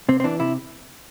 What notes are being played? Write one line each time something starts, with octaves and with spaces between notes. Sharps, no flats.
C3 C4
C4
E3 D4
C3 E4